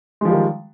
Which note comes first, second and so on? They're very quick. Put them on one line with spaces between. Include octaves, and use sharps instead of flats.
G#3 F3 G3 D#3